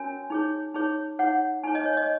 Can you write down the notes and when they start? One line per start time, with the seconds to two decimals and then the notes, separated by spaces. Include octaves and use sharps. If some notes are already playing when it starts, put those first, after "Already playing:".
Already playing: C#4 F#4 A#4 C#5 G#5
0.30 D#4 G#4 C#5
0.74 D#4 G#4 C#5
1.19 D#4 G#4 C#5 F#5
1.64 D#4 G#4 C#5 G#5
1.75 D#5
1.85 C#5
1.97 D#5